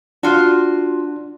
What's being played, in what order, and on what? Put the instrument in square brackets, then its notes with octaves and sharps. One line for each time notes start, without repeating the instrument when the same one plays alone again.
[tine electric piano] D4 [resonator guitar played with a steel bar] F4 F#4